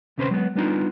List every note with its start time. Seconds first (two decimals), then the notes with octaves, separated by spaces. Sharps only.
0.18 D2 C3 C#4 B4 C5 C6
0.31 F#3 G#3 B3
0.55 G3 B3 D4 D#4 F4